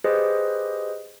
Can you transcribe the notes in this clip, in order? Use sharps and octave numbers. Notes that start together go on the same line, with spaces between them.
G4 G#4 B4 C5 D#5